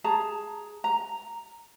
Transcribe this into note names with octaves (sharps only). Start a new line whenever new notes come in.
G#4 A5 A#5
A#5